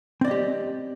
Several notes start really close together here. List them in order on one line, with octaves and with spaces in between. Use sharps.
C4 D5 D#5 G4